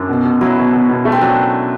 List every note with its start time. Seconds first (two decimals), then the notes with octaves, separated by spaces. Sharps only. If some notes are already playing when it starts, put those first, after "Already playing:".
Already playing: F#2 D4
0.09 B2
0.25 B2
0.41 F#3 E4
0.57 B2
0.73 B2
0.89 B2
1.05 A3
1.12 C4
1.21 F#3 D4